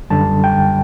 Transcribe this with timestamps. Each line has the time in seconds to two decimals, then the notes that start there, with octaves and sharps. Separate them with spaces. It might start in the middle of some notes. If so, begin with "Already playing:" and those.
0.10 F#2 D3 G3 A5
0.44 G5